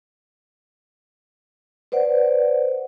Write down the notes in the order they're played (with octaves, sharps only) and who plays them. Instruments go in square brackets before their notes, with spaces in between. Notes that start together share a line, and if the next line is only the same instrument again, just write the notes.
[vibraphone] B4 C5 D5 F#5